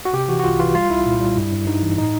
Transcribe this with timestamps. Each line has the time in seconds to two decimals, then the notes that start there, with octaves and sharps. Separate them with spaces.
0.05 F#4
0.13 C3 G4
0.28 E3 F#4
0.39 F#4
0.44 C2 F4
0.59 E3 F4
0.75 G3 F4
0.90 C2 E4
1.06 A#2
1.21 G3
1.36 G2
1.52 G2
1.67 G2 D#4
1.82 E3
1.98 A2 D#4